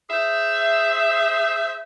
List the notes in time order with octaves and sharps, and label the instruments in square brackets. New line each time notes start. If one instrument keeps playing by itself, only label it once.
[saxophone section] G#4 C5 E5